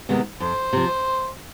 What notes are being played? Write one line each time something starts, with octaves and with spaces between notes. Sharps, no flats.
C3 D#3 G#3 B3
F2 C5
C3 F3